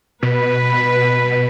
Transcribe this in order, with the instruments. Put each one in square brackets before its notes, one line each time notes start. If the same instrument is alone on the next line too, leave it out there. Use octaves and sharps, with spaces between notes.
[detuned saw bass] B2 [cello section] B4